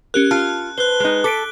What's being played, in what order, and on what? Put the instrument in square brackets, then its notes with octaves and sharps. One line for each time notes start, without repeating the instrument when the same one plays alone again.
[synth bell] C#4 G4 A#4 [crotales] F#6
[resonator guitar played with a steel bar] F4 [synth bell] A5
[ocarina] B4 [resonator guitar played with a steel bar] C5 [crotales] F#6 G7
[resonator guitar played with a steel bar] G#3 D#4
[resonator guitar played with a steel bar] A4 [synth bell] D6 B6 D7